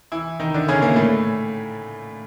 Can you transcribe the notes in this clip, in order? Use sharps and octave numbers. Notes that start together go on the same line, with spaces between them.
E3 E4
D#3 D#4
D3 D4
C#3 C#4
A#2 A#3
A2 A3